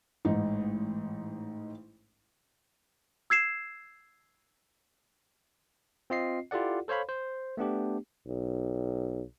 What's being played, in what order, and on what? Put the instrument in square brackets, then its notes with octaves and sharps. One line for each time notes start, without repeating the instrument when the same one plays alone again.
[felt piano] A1 G#2 D#4
[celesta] E6 G#6 C7 E7
[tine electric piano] C4 F4 D#5 C7
E4 F4 G4 A4 D5 F#5
A4 C5 C#5 F5 B5
C5
A3 B3 D4 G4
[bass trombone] B1